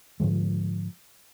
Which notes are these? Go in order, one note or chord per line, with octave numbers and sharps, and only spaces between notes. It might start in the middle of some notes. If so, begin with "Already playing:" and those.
G#2 D3 F3 G#3